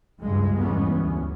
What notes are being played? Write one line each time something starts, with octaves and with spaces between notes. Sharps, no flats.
C#2 G2 G#3
G1 E2 G2 E3 B3 C#4
D2